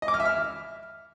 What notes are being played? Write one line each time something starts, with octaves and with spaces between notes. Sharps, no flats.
D#5
D6
F6
E5
F6